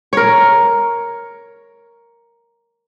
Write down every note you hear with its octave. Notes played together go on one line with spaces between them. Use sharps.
A#4 C#5